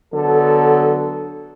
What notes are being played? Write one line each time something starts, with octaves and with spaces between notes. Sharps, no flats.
D3 F#3 B3 A4